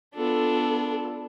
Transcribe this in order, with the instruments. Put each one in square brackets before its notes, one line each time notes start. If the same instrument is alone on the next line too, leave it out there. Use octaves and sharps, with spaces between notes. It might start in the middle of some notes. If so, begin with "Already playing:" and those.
[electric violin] B3 F4 [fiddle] D4 [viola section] A4